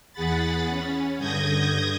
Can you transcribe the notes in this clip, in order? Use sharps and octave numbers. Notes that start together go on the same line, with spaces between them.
E2 G#4 F#5 B5 A6
C#4
G2 D3 D#6 G6 G#6 A#6